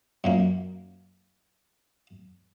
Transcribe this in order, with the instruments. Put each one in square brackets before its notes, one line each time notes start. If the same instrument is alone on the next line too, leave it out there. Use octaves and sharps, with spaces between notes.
[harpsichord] F#2 A#2 A#3